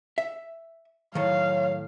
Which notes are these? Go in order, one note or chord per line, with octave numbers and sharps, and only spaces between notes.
E5
A2 D#3 F#3 F5